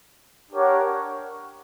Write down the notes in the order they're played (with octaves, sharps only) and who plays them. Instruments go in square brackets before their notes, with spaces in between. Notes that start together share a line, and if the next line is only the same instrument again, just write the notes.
[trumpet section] D4 G4 A#4 C#5 F#5